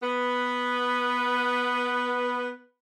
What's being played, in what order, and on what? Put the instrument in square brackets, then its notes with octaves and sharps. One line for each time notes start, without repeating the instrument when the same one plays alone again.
[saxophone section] B3 B4